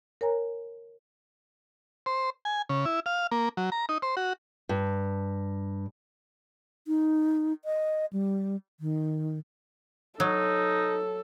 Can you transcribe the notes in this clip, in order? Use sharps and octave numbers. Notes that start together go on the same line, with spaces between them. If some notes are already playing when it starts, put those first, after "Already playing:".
A#4 C#5 G#5 A#5
C5
G#5
C#3
E4
F5
A#3
F#3
A#5
D#4
C5
F#4
G2
D#4
D#5
G3
D#3
F#3 D#4 A4